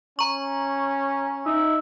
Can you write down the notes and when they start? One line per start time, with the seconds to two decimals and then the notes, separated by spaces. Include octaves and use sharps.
0.19 C#4 A#5 C#6
1.46 D#4 E5